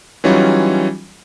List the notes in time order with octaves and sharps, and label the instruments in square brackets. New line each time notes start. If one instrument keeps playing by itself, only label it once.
[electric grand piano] E3 F#3 G3 C#4 D#4 F4